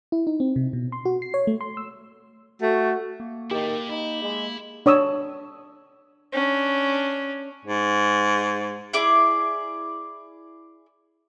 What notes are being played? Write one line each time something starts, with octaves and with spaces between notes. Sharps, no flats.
E4
D#4
C4
C3
B2
C6
F#4
C7
C#5
A3
C6
E6
A3 F#4
A#3
D#3 A3 E4 G4
D#4 E4
G#3
D4 C#5 D#6 E6
C#4 D4
G#2
E4 G#4 D5 D6